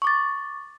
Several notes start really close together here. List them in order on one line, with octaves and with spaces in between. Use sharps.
C#6 D6 A6